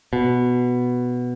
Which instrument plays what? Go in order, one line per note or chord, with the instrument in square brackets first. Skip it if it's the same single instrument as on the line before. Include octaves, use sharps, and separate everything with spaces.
[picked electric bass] B2